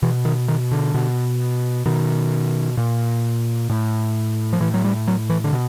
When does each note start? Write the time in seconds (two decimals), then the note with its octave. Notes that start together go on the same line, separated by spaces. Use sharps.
0.02 B2 E3
0.25 D#3
0.48 D#3
0.72 D3
0.94 B2
1.86 B2 D#3
2.77 A#2
3.70 A2
4.53 F3
4.60 A2 E3
4.74 F#3
4.84 G3
5.08 F#3
5.30 E3
5.44 D3
5.53 B2